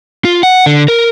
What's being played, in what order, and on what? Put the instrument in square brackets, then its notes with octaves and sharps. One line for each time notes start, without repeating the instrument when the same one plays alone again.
[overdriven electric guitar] F4
F#5
D3
A#4